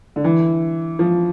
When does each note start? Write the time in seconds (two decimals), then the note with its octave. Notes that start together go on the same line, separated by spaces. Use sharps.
0.16 D3
0.24 E3
0.99 F3